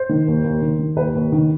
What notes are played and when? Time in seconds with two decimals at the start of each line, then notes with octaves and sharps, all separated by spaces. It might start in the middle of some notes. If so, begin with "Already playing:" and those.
Already playing: C5
0.09 D#3
0.28 D#2
0.44 D#2
0.62 D#3
0.79 D#3
0.96 D#2 B4
1.15 D#2
1.32 D#3